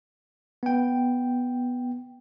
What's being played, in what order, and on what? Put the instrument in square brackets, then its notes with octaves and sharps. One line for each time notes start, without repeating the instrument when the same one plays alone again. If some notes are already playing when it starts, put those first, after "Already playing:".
[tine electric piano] B3 G5